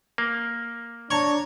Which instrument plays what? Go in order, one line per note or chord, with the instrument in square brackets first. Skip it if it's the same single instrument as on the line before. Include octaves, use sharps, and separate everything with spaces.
[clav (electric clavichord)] A#3
[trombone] D4 [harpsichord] C#5 [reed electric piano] A5 A#5 C#6